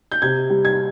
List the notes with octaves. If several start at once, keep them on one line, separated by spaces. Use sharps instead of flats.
G6
C3 G#6
G3
G#6